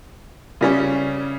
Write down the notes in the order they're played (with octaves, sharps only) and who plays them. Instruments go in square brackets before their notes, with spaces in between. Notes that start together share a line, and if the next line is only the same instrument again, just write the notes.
[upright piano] C#3 G3 C#4